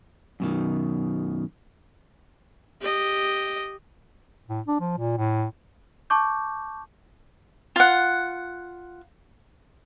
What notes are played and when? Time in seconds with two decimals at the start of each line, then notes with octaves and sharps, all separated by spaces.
0.40 F#2 B2 D#3
2.81 G4 D#5
4.49 A2
4.68 D4
4.80 F3
4.98 A#2
5.17 A2
6.10 A5 C#6 D6 G6
7.76 F4 F#5